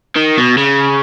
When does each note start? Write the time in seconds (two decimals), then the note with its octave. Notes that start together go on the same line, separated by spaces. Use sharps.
0.16 D#3
0.38 B2
0.57 C#3